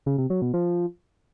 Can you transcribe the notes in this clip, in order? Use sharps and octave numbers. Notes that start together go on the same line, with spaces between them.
C#3
C3
F#3
B2
F3